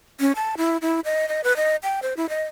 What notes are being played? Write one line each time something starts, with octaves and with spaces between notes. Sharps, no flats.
C#4
A5
E4
E4
D#5
D#5
B4
D#5
G5
C5
E4
D#5